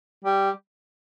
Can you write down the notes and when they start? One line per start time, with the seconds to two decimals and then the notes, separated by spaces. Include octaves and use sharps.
0.25 G3